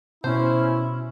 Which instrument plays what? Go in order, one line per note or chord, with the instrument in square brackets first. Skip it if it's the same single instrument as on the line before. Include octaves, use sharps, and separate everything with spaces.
[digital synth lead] B2 [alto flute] C#4 [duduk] E4 [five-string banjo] C5